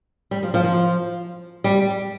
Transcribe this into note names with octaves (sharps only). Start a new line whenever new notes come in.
G3
F3
F3
F3
G3